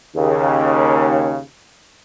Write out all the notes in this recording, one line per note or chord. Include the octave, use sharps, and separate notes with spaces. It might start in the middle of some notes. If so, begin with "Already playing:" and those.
D#2 C#3